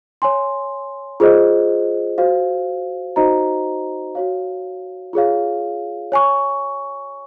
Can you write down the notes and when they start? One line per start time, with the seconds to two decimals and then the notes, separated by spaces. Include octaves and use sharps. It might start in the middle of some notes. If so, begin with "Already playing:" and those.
0.22 C#5 G#5 C6
1.20 F4 G#4 C5 D#5
2.18 F#4 C5 F5
3.16 D#4 F#4 C5 D#5 A#5
4.15 F#4 C#5 F5
5.13 F4 G#4 C#5 F5
6.12 C#5 G#5 C#6